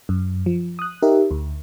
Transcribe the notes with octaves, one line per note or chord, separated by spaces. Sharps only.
F#2
F3
D#6 F#6
D#4 G4 A#4 E5
D2